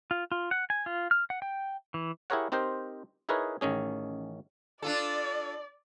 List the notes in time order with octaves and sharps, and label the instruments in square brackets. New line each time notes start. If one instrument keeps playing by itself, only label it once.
[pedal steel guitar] F4
F4
F#5
G#5
F4
F6
F#5
G5
E3
[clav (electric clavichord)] E4 G4 G#4 A#4 C#5 F#5
C4 D#4 G4 A#4 C5
D#4 E4 G#4 A#4 B4 C#5
A1 D#3 C#4 G#4
[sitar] D4 F4 A4 [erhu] D5